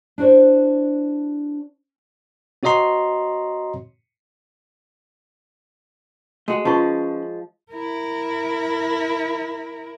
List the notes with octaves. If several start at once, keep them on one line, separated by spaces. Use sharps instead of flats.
D4 E4 F#4 C5 D5
C4 F#4 C#5 D#5 A#5 C6
G#3 A3 F#4 G#4
F3 C#4 D#4 F4 B4 C6 C#6
E4 A#4